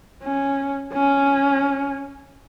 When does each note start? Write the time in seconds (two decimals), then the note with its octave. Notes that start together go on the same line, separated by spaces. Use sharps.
0.24 C#4
0.93 C#4